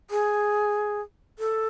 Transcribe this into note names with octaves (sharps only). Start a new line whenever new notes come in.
G#4
A4